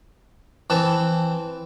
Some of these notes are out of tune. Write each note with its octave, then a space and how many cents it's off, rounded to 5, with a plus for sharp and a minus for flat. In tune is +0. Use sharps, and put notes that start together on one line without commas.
E3 +5 C4 +0 A5 +0